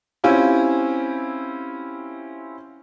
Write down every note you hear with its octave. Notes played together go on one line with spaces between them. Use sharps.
C4 C#4 E4 F4 G4